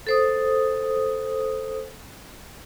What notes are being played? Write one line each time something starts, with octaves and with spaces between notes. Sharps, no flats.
A4 C5 D#6